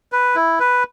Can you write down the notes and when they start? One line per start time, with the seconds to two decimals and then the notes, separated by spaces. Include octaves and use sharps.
0.12 B4
0.35 E4
0.60 B4